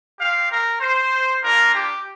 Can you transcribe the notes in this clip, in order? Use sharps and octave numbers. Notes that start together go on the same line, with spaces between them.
C4 G4 F5
A#4
C5
A#3 D4 F4 A#4
G4